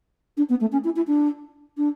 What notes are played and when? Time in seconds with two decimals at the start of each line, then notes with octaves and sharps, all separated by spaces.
0.37 D4
0.49 B3
0.60 A3
0.72 C#4
0.84 E4
0.96 E4
1.07 D4
1.77 D4